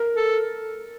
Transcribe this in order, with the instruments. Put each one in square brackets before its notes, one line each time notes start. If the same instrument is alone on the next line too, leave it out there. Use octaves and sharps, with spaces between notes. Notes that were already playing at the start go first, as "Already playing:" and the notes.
Already playing: [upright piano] A#4
[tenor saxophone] A4